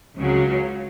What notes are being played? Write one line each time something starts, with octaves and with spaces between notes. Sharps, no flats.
C#2 C#3 F#3